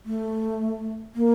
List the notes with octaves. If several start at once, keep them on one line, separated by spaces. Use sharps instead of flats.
A3
A#3